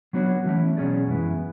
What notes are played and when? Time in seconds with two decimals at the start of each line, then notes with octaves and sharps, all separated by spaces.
0.13 F#3 B3 D4 F#4 C#5
0.45 E3 A3 C#4 E4
0.77 B2 F#3 C#4 G#4 D5
1.07 F#2 E3 G#3 B3 E4